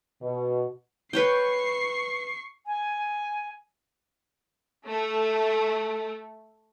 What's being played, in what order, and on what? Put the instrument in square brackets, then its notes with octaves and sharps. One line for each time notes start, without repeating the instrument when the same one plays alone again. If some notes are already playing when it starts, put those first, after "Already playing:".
[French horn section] B2
[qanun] B4 C#5 G5 [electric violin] C#6 C7
[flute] G#5
[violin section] A3 [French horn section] A4